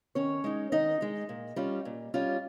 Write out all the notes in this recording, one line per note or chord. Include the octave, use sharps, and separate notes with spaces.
D#3 C#4 C#5
G#3 D#4
D#3 D#4 D#5
G#3 D#4
A#2
G3 C#4 F4
A#2
G3 C#4 F4